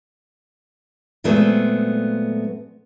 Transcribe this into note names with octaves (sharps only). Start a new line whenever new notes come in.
A#2 F#3 G#3 A3 B3 C4